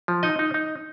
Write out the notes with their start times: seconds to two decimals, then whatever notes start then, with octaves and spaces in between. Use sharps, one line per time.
0.08 F3
0.23 D#4 D#5
0.39 D#4
0.54 D#4